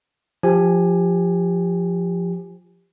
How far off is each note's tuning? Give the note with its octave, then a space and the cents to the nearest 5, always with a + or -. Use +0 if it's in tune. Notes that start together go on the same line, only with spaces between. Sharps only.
F3 +0 G4 +20 G#5 +0